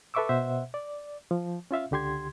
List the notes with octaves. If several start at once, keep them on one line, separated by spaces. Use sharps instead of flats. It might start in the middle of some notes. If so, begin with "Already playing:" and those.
A4 B4 E5 C#6 D6 E6
B2 C5 E5 F#5
D5
F3
C#4 F4 E5 F5
C#2 D3 G4 C6 G#6